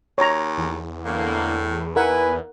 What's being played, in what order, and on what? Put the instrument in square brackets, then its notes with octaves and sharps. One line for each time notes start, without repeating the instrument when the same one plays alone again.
[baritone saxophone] D#2 [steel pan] C#5 A#5
[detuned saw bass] E2
[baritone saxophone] A2 [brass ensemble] D3 E3 A#3
[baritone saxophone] E4 [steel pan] A#4 F#5 [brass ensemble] B4 G#5